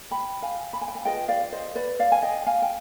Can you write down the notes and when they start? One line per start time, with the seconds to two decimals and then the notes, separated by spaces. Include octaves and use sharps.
0.11 G5 B5
0.42 F5 G#5
0.73 B5
0.81 G#5
0.88 G5
0.95 F5 G#5
1.05 F4 G#4 B4 D#5 G5
1.28 D5 F5
1.52 C5 D#5
1.75 B4 D5
1.99 D5 F5
2.12 G#5
2.23 D#5 G5
2.47 F5 G#5
2.62 G5